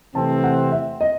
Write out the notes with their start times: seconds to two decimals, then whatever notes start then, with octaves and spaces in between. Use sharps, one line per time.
0.15 C3 E3 A3 C4 A5
0.44 F#5
0.72 E5
1.01 D#5